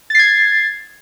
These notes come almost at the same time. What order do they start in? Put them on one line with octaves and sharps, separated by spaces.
A6 C7 G#6